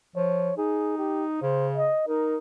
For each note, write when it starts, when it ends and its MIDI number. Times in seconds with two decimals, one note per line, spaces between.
0.16 0.51 53
0.16 0.54 73
0.58 1.41 63
0.58 0.97 68
0.98 1.25 67
1.42 1.90 49
1.42 1.68 72
1.77 2.04 75
2.08 2.38 63
2.08 2.38 70